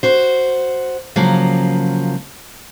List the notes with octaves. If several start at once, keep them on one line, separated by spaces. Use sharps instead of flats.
F#4 C5
C#3 F3 F#3 A#3